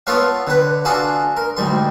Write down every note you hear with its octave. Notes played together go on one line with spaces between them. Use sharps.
B3 F4 A4 C#5 F5
D3 B4
D4 F4 F#4 G#4 A4
A#4
D2 G#2 G3 C6